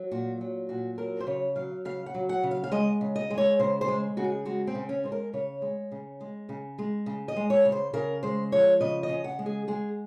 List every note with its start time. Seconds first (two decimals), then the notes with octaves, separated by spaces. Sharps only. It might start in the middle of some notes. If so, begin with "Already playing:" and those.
Already playing: F#3
0.11 A#2 F#4
0.41 F#3
0.69 A#2 F#4
0.98 F#3 A#4
1.20 C5
1.27 C#3 C#5
1.56 F#3 F5
1.85 C#3 F5
2.06 F#5
2.15 F#3
2.29 F#5
2.43 C#3
2.51 F5
2.64 F5
2.72 G#3 D#5
3.01 C#3
3.16 D#5
3.30 G#3
3.38 C#5
3.59 C#3 C5
3.81 C5
3.88 G#3
4.17 C#3 F#4
4.24 G#4
4.45 G#3 F#4
4.67 C4
4.75 C#3
4.89 C#4
5.04 G#3 C5
5.12 A#4
5.33 C#3 C#5
5.62 G#3
5.92 C#3
6.21 G#3
6.49 C#3
6.78 G#3
7.06 C#3
7.28 D#5
7.36 G#3
7.50 C#5
7.65 C#3
7.72 C5
7.93 C#3 A#4
8.23 G#3 C5
8.52 F3 C#5
8.81 C#3 D#5
9.03 D#5
9.09 C#3
9.24 F#5
9.39 G#3
9.46 G#4
9.68 G#3 G#4